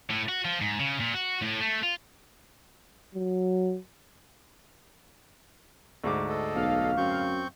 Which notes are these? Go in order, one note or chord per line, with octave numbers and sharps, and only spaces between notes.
A2
F#4
F3
G#2
C#3
A#2
F#4
A2
A3
F4
F#3
D2 G#2 D6
A4 D#5
B1 F5
F#2 C4 C#6 G6